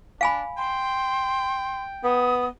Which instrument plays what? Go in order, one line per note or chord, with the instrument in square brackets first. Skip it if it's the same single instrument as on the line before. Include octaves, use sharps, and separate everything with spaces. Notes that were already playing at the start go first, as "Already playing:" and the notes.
[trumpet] D4 [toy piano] F5 G#5 B5
[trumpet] G5 [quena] C6
[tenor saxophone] B3 [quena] D#6